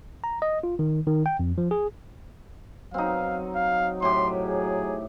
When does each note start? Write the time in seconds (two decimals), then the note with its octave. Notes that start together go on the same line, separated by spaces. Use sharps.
0.24 A#5
0.42 D#5
0.63 F4
0.79 D#3
1.07 D#3
1.26 G5
1.40 F2
1.58 F3
1.71 G#4
2.94 F#3 C4 D#4 F5
3.56 F5
4.02 A2 G4 C6
4.44 G#4